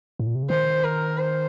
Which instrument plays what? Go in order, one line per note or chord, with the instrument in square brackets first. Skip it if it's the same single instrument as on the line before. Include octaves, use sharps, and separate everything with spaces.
[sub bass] A2
A#2
C3
C#3
[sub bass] D#3 [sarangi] C5
[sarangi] A#4
C5